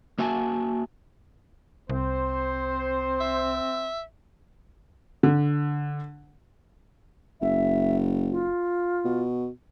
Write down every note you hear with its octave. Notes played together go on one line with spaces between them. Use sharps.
A#3 F#4 E5 G#5 A5
C2 C4 C5
E5
D3
F#1 E5
F4
B2